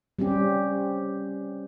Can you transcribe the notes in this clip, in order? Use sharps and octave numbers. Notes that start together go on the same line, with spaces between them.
G3 C4 C#4 G4